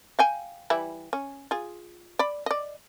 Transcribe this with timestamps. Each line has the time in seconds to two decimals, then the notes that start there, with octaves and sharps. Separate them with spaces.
0.19 F5 G5 G#5
0.70 E3 G3 E4
1.13 C#4
1.51 F4 G#4
2.19 D5 B5
2.46 D5 D#5